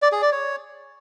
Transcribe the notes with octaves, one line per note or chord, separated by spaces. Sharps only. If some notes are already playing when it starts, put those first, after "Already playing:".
D5
G#4
D5
C#5